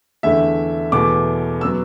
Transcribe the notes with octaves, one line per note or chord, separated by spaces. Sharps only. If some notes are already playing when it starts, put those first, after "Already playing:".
E2 D3 A3 E5
E2 B2 A3 D6
F#3 B3 E6